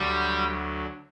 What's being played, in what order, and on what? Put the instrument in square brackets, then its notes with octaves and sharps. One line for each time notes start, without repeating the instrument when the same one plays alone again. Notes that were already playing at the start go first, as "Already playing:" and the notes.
Already playing: [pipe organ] D2 D3 F#3 [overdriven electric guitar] G3